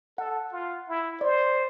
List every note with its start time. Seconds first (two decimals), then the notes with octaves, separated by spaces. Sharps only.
0.18 A4 F#5
0.52 F4
0.89 E4
1.21 C5 D5